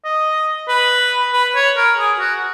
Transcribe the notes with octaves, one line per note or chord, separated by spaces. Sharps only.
D#5
B4
B4
C#5
A#4
G#4
F#4